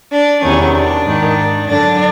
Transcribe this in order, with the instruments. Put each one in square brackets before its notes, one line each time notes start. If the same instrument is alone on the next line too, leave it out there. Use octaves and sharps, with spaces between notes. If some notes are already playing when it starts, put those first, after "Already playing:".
[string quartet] D4
E2 C3 D#3 C#4
D4
G#2 D#3
F#2 D3 D4